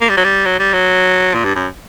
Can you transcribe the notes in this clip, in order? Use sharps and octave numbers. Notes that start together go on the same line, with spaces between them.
A#3
G3
F#3
G3
F#3
G3
F#3
A#2
G2
F#2